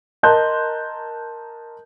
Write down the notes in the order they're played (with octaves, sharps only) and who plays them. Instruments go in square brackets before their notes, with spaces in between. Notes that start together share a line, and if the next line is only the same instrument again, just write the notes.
[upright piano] A#4 D#5 A5 C6 F#6 G6